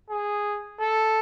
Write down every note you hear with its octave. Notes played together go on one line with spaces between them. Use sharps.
G#4
A4